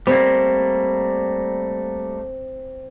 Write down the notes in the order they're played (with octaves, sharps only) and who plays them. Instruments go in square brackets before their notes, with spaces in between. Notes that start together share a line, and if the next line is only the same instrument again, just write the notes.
[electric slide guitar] G3 A3 A#3 [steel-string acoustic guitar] C4